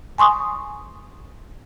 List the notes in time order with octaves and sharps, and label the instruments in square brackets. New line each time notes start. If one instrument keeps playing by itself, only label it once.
[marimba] G#5 C6 C#6 D#6